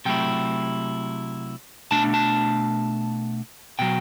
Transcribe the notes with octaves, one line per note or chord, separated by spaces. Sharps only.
C3 F#3 A3 E4 G5
B2 A3 D4 A5
A5
B2 F#3 G5